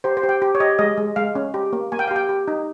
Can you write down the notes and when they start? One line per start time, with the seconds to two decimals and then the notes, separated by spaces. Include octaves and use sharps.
0.04 G4 C5
0.17 C5
0.23 G4
0.29 G5
0.42 G4
0.55 C#5
0.60 G4 D#5
0.79 G#3 D#5
0.97 G#3
1.16 G#3 F5
1.35 C#4
1.54 G4
1.73 A#3
1.92 A#3 G#5
1.99 G5
2.08 F5
2.11 G4
2.16 G5
2.29 G4
2.48 D#4